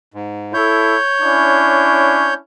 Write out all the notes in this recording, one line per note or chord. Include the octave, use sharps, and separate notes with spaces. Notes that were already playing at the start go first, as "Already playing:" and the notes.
G#2
E4 A4 C#5 G6
C#4 D4 E4